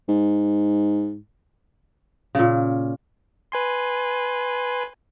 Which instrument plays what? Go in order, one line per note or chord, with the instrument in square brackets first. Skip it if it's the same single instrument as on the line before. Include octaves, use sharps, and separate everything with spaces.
[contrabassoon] G#2
[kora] A#2 C#3
[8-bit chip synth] B4 G#5 C6